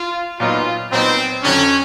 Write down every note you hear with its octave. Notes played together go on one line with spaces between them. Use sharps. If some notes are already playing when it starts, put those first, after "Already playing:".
Already playing: F4
A#2 F#3 B3 D#4 F4
A#2 F#3 B3 C4 D#4
F2 D3 F#3 C#4